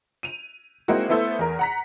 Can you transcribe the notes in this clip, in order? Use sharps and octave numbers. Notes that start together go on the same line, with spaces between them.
D#7 F7
G#3 A#3 C4 D#4 E4 F#4
A3 B3 E4 A4 C5 E5
E2 A#4
F#5 A#5 B6